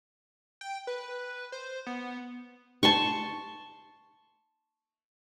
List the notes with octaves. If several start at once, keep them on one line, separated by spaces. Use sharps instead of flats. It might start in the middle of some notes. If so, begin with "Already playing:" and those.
G5
B4
C5
B3
A5 C6 C#6